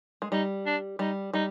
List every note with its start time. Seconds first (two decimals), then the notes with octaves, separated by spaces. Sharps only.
0.22 G#3
0.32 G3 D#4
0.66 D4
0.99 G3 D#4
1.33 G3 D#4